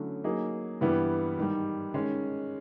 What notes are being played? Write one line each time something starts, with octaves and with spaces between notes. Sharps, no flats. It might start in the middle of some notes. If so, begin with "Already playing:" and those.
Already playing: D3 F#3 A3 C#4 E4
F#3 A#3 D#4 G#4
G2 E3 G3 B3 E4
G#2 D#3 G3
D#3 G#3 C#4